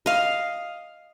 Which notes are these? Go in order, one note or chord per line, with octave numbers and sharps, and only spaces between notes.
D#5 F5